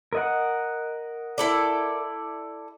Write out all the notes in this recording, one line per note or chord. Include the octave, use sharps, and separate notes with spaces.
A#4 D#5 F#5
E4 A4 D5